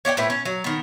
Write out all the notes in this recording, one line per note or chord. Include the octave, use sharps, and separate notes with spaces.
C#5 D5 F5 G5
A2 C4 E4 B4
C#4
F#3
D#3 B3